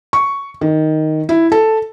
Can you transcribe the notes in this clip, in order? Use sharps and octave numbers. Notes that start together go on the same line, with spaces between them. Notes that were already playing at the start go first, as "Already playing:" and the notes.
C#6
D#3
E4
A4